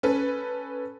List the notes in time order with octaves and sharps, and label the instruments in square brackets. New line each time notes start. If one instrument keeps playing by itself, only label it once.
[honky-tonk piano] C#4 A4 B4